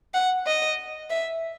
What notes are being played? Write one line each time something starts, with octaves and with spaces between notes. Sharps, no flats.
F#5
D#5
E5